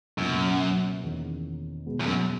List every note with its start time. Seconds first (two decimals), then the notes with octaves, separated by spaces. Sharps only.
0.18 C#2 F#2 B2 A#3
1.02 E2 D#3 A#3 C#4
1.86 B2 G#3 B3
2.00 E2
2.06 F#2